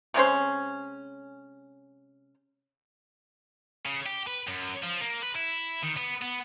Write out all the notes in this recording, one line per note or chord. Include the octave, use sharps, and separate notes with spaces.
C3 G#3 C#4 C5
C#3
G4
B4
F#2
F3
A#3
B4
E4
D#3
B3
B3